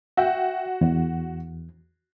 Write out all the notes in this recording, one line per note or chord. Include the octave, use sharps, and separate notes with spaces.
F#4 E5 G5
E2